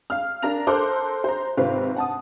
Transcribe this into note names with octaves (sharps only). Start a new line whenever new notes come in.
F5 F6
D4 A#4 F5 A#5 A#6 F7
A4 A#4 C5 D6 F#6
C5 A#5
G#1 C3 C4 F4 B4 F5
F#5 A5 D#6